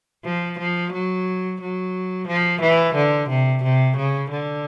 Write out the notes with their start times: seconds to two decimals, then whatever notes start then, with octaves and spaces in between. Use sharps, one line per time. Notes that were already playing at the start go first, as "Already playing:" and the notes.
0.25 F3
0.59 F3
0.93 F#3
1.61 F#3
2.27 F3
2.61 E3
2.95 D3
3.29 C3
3.63 C3
3.96 C#3
4.30 D3